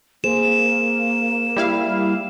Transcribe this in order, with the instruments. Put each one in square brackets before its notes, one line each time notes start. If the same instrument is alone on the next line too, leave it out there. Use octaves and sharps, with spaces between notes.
[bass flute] A#3 [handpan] G#4 C5 [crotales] E7
[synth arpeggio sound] G3 E4 F5